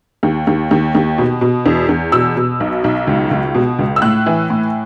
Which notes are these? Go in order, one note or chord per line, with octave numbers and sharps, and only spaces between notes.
D#2
D#2
D#2
D#2
B2
B2
E2
E2
B2 E6
B2
B1
B1
C#2
C#2
B2
C#2
E6
A2 F#6
E3
A2